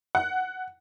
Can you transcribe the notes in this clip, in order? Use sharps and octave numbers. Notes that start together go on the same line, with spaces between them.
F#5